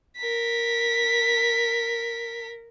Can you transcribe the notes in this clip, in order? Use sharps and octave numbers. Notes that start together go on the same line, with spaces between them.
A#4 B6